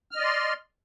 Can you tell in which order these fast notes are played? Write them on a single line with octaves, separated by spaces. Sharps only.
F6 D#5 D5 C6